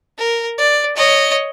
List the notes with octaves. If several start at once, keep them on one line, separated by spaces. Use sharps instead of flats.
A#4
D5
C#5 D#5